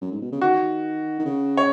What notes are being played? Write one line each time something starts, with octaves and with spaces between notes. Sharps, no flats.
F#2
G#2
B2
C#3
D#3 F#4
D#3
C#3
C#5